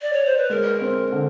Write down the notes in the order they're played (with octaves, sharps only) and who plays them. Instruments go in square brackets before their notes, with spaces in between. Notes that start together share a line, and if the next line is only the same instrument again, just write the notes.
[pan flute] D5
C#5
C5
B4
[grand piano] G#3 [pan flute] A#4
[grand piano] C4
D3